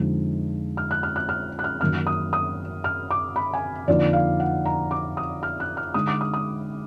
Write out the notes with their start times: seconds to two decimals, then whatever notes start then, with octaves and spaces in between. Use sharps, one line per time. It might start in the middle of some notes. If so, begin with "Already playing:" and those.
Already playing: F2 D3 G#3 D#4
0.77 F6
0.91 F#6
1.03 F6
1.16 F#6
1.29 F6
1.59 F#6
1.64 F6
1.81 F#2 D#3 A#3 F6
2.07 D#6
2.33 D#6
2.84 F6
3.11 D6
3.36 B5
3.54 G#5
3.88 F2 D3 F3 A#3 D#4 D5
4.13 F5
4.40 F#5
4.65 A#5
4.91 D6
5.17 D#6
5.43 F6
5.60 F#6
5.77 F6
5.94 D3 G#3 D#4 D#6
6.07 D6
6.21 D#6
6.34 D#6